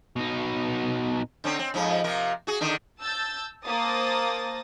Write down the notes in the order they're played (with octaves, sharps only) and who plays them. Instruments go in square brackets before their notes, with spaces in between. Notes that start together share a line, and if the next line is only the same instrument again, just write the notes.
[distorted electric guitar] B2 D#4
[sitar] D3 C4 C#4
C4
F2 G#2 F3
C3 F3 A#4
F#4 G#4
D3 D#3 D4
[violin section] A5 E6 G6 A6
A#3 C5 A5 D#6 A6 A#6